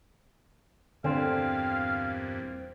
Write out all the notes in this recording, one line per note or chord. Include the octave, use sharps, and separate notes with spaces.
E2 G2 A#2 D3 C4 F5